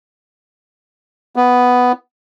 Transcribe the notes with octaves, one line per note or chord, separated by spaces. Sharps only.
B3